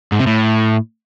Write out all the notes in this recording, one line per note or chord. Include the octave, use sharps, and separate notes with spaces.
G#2
C3
A2